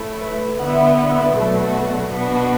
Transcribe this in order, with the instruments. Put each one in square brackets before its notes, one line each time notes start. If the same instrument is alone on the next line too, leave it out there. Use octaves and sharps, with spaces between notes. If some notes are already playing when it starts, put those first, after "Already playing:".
Already playing: [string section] A2 A3 E4 [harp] A4
[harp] B4
[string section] D3 B3 E4 [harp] F#5
[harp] E5
D5 F#5
D5 F#5
B4 E5
A4 D5
[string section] B2 F#3 A3 D4 F#4
[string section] B2 B3 D4 F#4 [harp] B4